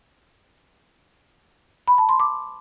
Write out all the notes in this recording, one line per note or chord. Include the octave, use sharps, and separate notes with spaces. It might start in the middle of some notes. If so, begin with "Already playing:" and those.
B5
A5
C6
D6